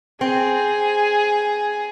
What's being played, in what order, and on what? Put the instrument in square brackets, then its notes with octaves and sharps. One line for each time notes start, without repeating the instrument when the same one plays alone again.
[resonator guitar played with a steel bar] C4 [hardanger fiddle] G#4